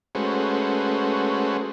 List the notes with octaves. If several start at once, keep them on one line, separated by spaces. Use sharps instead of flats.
G#3 A3 C#4 F#4 B4 C5